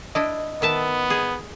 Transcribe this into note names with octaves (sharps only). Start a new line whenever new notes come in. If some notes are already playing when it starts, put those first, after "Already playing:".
D4 E4 D#5
D#3 B3 E5 A5
G#4